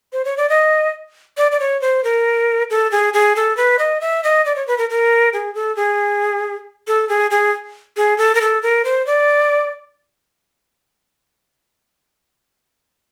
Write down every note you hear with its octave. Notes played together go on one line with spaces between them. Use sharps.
C5
C#5
D5
D#5
D5
D5
C#5
C5
A#4
A4
G#4
G#4
A4
B4
D#5
E5
D#5
D5
C#5
B4
A#4
A#4
G#4
A4
G#4
A4
G#4
G#4
G#4
A4
A#4
A4
A#4
C5
D5